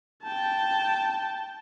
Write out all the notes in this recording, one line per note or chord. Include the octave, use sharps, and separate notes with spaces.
G5 A5